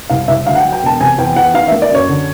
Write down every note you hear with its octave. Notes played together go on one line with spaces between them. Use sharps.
C2 F5
C2 E5
D2 F5
F#5
G5
F#3
G5
E1 A5
C3 G#5
E2 G5
E2 F#5
D#3 F5
A#3 E5
D5
F#2 C#5
D3